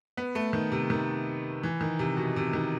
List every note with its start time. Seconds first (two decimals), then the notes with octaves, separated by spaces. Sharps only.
0.17 B3
0.35 A3
0.53 D#3
0.72 C3
0.90 D#3
1.63 E3
1.81 D#3
1.99 C3
2.17 B2
2.36 C3
2.53 D#3